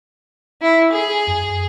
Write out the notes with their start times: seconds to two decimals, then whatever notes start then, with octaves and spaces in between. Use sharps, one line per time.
0.62 E4
0.92 G#4
1.27 F#2